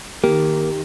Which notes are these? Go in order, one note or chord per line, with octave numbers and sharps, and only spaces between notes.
D#3 A#3 G4